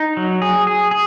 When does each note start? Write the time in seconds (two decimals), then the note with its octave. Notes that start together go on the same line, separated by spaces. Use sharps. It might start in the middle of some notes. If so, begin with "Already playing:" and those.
Already playing: D#4
0.17 F#3
0.42 G#4
0.67 G#4
0.91 G#4